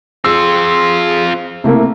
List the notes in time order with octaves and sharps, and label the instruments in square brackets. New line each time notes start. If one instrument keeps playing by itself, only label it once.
[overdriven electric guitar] C4 F4 [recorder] G#4 [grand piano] E6
[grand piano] C3 A3 A#3 [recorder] E4